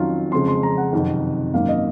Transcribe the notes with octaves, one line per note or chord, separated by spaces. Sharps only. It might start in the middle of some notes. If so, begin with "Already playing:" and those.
Already playing: F2 D#3 F#3 C#4 F4
F2 C#3 F3 G#3 C6
C6
A#5
F#5
F#1 F2 C3 D#3
G#1 F#2 D#3 A#3 F5
D#5